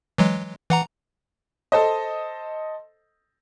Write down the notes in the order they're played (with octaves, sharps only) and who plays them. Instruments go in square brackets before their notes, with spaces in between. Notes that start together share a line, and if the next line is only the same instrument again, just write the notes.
[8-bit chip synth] E3 F#3 G#3
E3 F#5 A#5
[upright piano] A4 C5 D#5